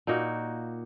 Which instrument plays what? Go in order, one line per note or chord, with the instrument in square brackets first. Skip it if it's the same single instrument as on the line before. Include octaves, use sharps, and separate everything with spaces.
[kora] A#2 A#3 D#4 F#4